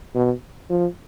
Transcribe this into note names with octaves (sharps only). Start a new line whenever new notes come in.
B2
F3